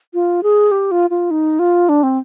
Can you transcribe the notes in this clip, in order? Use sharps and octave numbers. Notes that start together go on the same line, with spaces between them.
F4
G#4
G4
F4
F4
D#4
F4
D4
C4